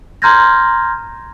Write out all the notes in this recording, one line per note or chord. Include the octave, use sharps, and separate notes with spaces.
A#5 C6 F6 G6 G#6 A#6